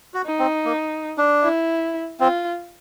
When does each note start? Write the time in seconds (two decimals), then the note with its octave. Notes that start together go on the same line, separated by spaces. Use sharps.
0.14 F#4
0.26 D#4
0.39 C4
0.65 A#3
1.18 D4
1.43 E4
2.20 C4 F4